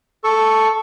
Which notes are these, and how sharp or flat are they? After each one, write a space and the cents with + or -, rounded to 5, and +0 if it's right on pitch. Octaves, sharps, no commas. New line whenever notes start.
A4 +0 C#6 +0